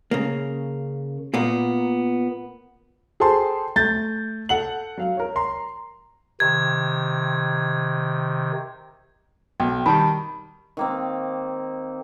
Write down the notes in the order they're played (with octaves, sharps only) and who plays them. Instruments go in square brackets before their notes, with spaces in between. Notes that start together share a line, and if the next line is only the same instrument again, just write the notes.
[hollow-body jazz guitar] C#3 A#3
A#2 A#3 B3
[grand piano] G#4 A4 C5 G5 A5 C6
A3 G6 A6
A4 F#5 F#7
F#3 F5
A#4 C#5
A#5 C6
[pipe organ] C3 D#3 [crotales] G#6
[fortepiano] B1 [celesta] G5
[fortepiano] D#3 G3 [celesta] A5 B5
[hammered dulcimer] D#3 A#3 C4